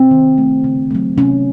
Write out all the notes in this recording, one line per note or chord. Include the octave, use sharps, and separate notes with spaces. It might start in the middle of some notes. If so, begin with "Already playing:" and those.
Already playing: C4
D#3
A3
C#3
F#3 A3
C3 C#4